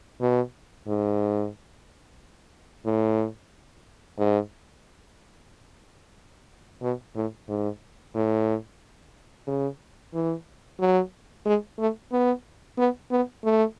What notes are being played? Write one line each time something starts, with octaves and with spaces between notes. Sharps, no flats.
B2
G#2
A2
G#2
B2
A2
G#2
A2
C#3
E3
F#3
G#3
A3
B3
B3
B3
A3